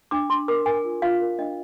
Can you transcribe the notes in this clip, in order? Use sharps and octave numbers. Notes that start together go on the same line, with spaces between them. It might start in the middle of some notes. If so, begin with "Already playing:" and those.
D4 D6
D4 C6
A#4 D6
A#4 G#5
F4
F4 F5
A#4
D4 D#5